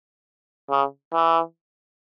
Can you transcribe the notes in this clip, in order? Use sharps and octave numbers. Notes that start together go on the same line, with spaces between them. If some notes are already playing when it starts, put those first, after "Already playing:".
C#3
E3